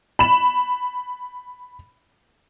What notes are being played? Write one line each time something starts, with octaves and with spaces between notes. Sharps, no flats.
B5 E7